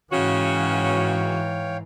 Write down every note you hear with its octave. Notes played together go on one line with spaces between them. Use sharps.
G#2 C#3 E3 C#4 F#4 C#5 F5 G5